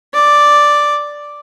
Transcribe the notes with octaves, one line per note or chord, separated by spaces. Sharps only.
D5